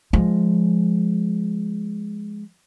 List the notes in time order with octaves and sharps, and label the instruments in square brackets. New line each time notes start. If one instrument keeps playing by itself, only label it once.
[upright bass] F3 G#3